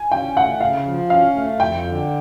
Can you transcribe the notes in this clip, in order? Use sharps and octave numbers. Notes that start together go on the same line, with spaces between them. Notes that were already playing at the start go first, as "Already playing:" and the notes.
Already playing: G#5
C#4 G5
A3 F#5
C#3 F5
F3
C#4 F5
A3
F2 G5
D3